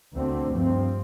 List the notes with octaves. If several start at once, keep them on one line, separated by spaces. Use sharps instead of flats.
D2 D3 A3 C4
G2 F3 C4